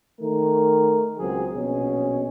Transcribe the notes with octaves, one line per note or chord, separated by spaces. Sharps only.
D#3 A3 A#4
C#2 F#3 C4 G#4
A#1 B2 C#4 G#4